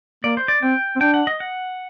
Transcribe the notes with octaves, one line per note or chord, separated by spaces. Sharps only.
A#3 D5
C5
D5
C4 G5
C4
D4 G5
F#5
D#5
F#5